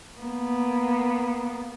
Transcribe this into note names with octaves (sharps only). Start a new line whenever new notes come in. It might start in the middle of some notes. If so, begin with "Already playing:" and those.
A#3 B3